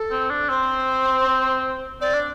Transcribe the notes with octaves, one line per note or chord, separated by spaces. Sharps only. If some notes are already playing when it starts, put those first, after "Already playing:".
Already playing: A4
C4
D4
C4 C5
C4 D5
D4